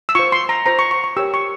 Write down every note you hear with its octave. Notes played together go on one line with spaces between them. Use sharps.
E6
F4 C5 C#6
C6
A#5
F4 C5 A#5
C#6
C#6
C#6
G4 A#4 C#5 E6
C#6